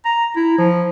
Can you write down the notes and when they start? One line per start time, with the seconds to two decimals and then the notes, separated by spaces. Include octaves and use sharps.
0.05 A#5
0.36 E4
0.58 F3